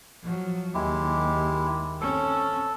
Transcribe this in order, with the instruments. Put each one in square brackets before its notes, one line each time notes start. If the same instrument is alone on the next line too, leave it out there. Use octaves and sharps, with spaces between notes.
[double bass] F3 F#3
[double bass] D#2 [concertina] G#3 E4 G4
[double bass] C4 C#4 [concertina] A4